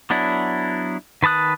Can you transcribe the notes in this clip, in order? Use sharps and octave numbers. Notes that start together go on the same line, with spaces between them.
F#3 B3 D4 E4
D#3 B4 A5 D#6 F#6